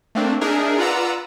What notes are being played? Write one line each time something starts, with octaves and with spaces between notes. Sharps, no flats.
A3 A#3 C4 D4
D4 D#4 G#4 A#4 E5
F4 B4 D5 F#5 A#5 E6